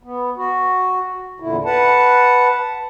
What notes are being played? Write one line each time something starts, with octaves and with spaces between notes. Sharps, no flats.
B3
F#4
E2 A#2 D3 E4
B4 F#5 A5